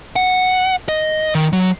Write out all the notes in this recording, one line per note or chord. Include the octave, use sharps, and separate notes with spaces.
F#5
D#5
D#3
F#3